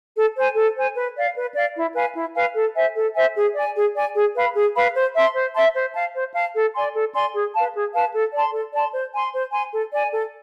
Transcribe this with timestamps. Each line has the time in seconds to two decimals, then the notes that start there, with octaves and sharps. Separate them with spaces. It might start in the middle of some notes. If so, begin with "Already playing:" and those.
0.16 A4
0.35 C5 G#5
0.55 A4
0.76 C5 G#5
0.96 B4
1.16 D5 F5
1.35 B4
1.55 D5 F5
1.76 E4
1.95 B4 F5 G#5
2.15 E4
2.35 B4 F5 G#5
2.55 A4
2.75 C5 E5 G#5
2.95 A4
3.15 C5 E5 G#5
3.35 G#4
3.54 D5
3.60 G#5
3.74 G#4
3.95 D5 G#5
4.15 G#4
4.35 B4 F5 B5
4.54 G#4
4.75 B4 F5 B5
4.94 C5
5.14 E5 A5 C6
5.34 C5
5.54 E5 A5 C6
5.75 C5
5.94 F5 A5
6.15 C5
6.34 F5 A5
6.54 A4
6.74 D5 G#5 C6
6.94 A4
7.13 D5 G#5 C6
7.34 G#4
7.53 B4 F5 A5
7.74 G#4
7.94 B4 F5 A5
8.13 A4
8.33 D5 A5 C6
8.53 A4
8.74 D5 A5 C6
8.93 C5
9.13 G#5 C6
9.33 C5
9.52 G#5 C6
9.73 A4
9.93 D5 G#5
10.13 A4